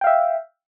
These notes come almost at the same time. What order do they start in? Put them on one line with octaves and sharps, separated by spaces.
G5 F5 E5